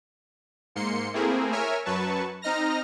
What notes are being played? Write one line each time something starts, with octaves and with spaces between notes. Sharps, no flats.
G#2 A#3 C6 C#7
A3 A#3 C4 E4 G#4 A#4
A#4 C#5 E5 G#5 F6
F#2 F#3 B4 A5 C#6
C4 D#4 D#5 A#5 F6 A#6